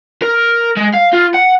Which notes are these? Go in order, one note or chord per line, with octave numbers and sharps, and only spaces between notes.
A#4
G#3
F5
F4
F#5